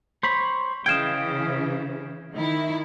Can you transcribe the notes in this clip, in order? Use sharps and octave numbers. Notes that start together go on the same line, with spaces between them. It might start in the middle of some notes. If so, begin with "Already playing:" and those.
C5 C#5 B5
C#3 E3 D#5 F5 G5 G#6 E7
D#3 E4